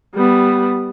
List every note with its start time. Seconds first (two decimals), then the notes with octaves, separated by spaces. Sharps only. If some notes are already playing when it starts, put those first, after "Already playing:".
0.15 G3 B3